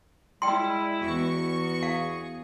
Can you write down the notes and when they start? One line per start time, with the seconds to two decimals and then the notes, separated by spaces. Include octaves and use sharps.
0.42 G3 G#3 E4 G5 C6
1.01 E2 F#4 C#6
1.83 G#4 F5